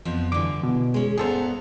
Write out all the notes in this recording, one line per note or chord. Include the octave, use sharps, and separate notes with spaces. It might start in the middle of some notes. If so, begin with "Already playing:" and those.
F2 F3 B3
G2 D3 E3 D6
B2
G#3 C#4
G2 B3 G#4 A4 C5 A#5